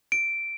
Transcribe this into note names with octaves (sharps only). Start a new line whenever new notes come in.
D7